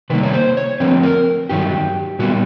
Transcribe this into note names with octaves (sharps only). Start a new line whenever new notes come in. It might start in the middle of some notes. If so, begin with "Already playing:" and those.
C3 D#3 G3 A#3 B4
C#5
C5
C#5
D3 F3 A3 C4 B4
A#4
G2 D#3 F#3 G4
A#2 G3 B3 F#4